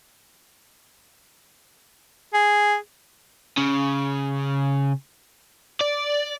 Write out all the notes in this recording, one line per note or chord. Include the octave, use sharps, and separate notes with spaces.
G#4
C#3
D5